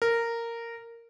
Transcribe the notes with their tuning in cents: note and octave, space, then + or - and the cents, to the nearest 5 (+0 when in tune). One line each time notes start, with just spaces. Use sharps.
A#4 -10